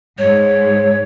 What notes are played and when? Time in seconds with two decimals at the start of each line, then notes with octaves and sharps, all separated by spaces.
0.18 G#2 C#5